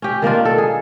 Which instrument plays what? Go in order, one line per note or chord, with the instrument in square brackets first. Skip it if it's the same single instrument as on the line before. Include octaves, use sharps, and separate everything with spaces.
[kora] C#4 G4
D#3 A#3 D4 F4
A4
G#4